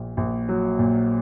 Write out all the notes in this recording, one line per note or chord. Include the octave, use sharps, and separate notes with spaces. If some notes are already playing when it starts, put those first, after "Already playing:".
Already playing: A#1 A#2
A#1
F#3
A#2